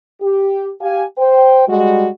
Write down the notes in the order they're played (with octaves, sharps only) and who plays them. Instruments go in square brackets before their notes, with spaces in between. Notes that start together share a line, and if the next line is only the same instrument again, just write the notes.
[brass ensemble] G4
G4 F5 G#5
C5 G5
G3 G#3 F#4